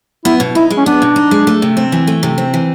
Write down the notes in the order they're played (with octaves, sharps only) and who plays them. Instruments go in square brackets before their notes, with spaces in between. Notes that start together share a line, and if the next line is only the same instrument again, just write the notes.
[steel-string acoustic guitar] B3 [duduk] E4
[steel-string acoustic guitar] B2
[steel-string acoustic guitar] D#4 [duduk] E4
[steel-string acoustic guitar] G#3
[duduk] C#4
[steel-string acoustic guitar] B3 [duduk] D4
[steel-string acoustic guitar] B2
D#4
G#3
A3
C3
C4
E3
A3
C3
C4
E3